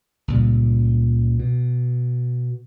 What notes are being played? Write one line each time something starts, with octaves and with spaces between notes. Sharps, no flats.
C#2 A#2 G3
B2